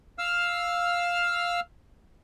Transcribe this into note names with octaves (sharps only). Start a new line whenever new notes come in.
F5 E6 F6